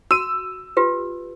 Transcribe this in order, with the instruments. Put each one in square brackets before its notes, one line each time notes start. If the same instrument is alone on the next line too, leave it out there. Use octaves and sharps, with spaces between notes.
[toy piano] F#4 [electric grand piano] E6 D#7
[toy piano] F4 G4 B4